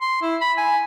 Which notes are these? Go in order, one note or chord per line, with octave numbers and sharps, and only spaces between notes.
C6
E4
B5
G#5